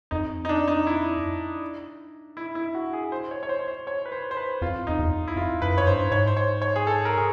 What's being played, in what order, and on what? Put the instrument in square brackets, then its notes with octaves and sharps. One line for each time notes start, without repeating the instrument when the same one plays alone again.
[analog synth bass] F2 [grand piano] D#4
[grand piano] D#4
D4
D#4
E4
E4
E4
F#4
G#4
C5
C#5
C#5
C5
C#5
C5
C#5
B4
C5
C5
B4
[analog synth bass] F2 [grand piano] F4
[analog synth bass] F2 [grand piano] D#4
[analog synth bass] E2
[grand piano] E4
[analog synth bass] F2 [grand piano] F4
[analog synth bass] F#2 [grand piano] B4
[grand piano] C#5
[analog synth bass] G2 [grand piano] C5
[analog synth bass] G#2 [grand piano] C#5
[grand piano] C5
C#5
C#5
G#4
A4
A#4
G#4